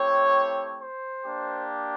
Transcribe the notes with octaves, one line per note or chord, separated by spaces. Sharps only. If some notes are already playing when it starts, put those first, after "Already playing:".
Already playing: A3 C4 E4 G4 C#5
C5
A#3 D4 G4